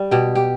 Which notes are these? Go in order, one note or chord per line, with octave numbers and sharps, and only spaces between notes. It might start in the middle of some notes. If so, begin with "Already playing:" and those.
Already playing: G3
B2 G4
G4